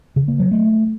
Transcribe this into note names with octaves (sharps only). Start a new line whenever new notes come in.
C#3
A#3
F#3
A3